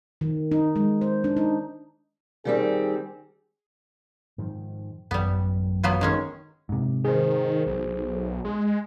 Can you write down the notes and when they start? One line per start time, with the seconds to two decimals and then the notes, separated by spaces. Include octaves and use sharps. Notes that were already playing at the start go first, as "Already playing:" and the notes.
0.21 D#3
0.51 D#4
0.76 G#3
1.01 C5
1.24 D4
1.37 D#4
2.45 D#3 G3 C4 G#4
4.38 G#2 D#3 F3
5.11 A1 F#2 G3 B3
5.84 F#3 B3 F4
6.01 D#3 G#3 C#4
6.69 G#2 C3
7.05 D#3 G#4 C5
7.66 B1
8.45 G#3